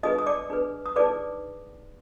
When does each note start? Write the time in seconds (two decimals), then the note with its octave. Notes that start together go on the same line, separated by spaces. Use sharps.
0.03 D4 G#4 B4 D#5 D#6
0.18 D#6
0.26 D5 D6
0.50 D4 G#4 B4
0.86 D#6
0.96 D#4 G#4 B4 D5 D6